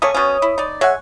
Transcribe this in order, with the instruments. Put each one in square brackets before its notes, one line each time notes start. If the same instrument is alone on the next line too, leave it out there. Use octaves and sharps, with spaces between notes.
[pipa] A3 A#3 C#4 [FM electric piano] C#5 D#6
[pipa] B2 C#4
E4
D#4 D5
[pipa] G#3 E5 G#5 [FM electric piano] C#5 F#5